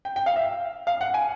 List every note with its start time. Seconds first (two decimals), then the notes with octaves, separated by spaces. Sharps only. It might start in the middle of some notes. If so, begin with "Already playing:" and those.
0.05 G5
0.16 G5
0.26 F5
0.36 E5
0.87 F5
1.01 F#5
1.14 G#5